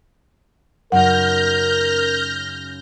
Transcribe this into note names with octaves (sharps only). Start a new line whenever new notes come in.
F#2 C#3 D#4 A#4 F#5 F6 G6 A#6